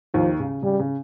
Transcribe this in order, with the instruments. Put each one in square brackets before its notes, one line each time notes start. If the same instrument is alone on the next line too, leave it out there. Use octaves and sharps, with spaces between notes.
[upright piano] D#2 D#3 [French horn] F3
[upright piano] C#3
[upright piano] C#3 [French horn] G3
[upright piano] C#3